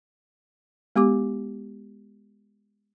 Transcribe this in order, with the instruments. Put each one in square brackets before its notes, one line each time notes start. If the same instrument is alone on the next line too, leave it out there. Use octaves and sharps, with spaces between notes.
[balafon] G#3 B3 G4 D6